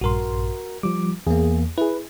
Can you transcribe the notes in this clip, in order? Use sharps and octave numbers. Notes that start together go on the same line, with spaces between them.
A#1 G2 F#4 A#4 C6
F3 G3 D6
E2 A#3 G#4
E4 G#4 B4